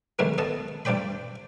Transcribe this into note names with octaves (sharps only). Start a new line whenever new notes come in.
B2 D#3 E3 F#3 G#3 A3
B3 A4 D#5 A5
A1 G2 C4 D5 G5 B5